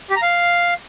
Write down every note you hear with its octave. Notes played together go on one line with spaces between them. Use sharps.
G4
A#5
F5